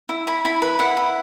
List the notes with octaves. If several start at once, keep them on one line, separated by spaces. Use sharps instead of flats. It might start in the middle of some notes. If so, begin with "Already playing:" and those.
E4
E4 B5
E4 B5
B4 B5
E4 F#5
E4